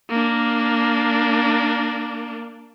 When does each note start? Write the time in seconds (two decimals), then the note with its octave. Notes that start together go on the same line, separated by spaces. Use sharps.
0.10 A#3 D4